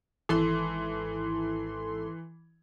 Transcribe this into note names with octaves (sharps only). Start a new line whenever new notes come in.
G#1 E3 A4 C6